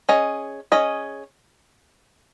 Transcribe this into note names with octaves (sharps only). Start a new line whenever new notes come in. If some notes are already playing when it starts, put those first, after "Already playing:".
C#4 G#4 D#5
C#4 G#4 D#5